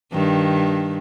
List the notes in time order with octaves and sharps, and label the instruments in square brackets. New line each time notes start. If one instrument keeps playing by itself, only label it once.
[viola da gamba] G2 D#3